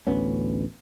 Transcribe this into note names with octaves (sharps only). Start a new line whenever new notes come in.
A1 D2 B3 C#4